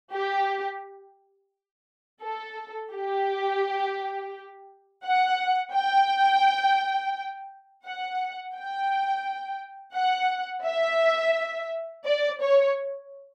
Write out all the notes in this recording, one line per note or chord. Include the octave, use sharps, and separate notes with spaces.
G4
A4
G4
F#5
G5
F#5
G5
F#5
E5
D5
C#5